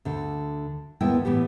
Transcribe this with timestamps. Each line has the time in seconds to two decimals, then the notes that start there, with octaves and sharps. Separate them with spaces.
0.05 D2 D3
1.01 D#2 D3 G#3 B3 E4 G5
1.25 A2 E3 B3 G4